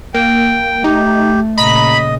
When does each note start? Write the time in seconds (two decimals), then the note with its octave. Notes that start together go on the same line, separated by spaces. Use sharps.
0.14 A#3 G5
0.84 A3 D#4 G4
1.58 A#2 C#3 D#5 A#5 B5